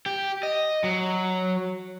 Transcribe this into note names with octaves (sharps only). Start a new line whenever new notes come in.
G4
D#5
F#3